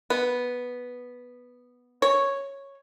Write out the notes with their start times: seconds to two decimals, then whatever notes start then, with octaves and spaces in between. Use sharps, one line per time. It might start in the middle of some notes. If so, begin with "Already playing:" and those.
0.10 B3
2.02 C#5